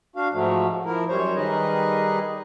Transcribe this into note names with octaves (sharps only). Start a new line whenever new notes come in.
D4 F#4 F5
G#2 F3 F#3 A3
F3 E4 A#4
F#2 G3 C5 C#5
D#3 G3 D#4 G#4 B4 D#5